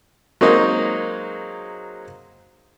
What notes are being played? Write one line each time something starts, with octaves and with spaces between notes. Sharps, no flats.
F#3 G#3 A#3 C4 D#4